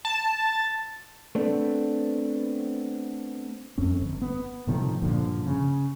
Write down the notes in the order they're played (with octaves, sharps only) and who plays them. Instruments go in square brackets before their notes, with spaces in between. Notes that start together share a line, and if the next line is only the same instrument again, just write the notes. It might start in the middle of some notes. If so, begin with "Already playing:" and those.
[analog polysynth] A5
[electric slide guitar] A3 B3 C4 D4
[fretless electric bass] F2 C4 C#4
G1
B3
A2 C3 D#3 F3
G2 A#2 D3 F3
C#3